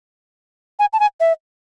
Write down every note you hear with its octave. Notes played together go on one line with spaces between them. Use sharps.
G#5
A5
G#5
E5